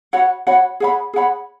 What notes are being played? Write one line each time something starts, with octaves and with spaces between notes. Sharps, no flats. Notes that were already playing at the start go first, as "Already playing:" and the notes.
F#4 C#5 F#5 B5
F#4 C#5 F#5 B5
G#4 C#5 F#5 B5
G#4 C#5 F#5 B5